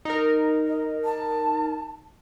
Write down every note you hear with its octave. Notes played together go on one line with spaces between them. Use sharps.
D#4 A#4
D#5
A5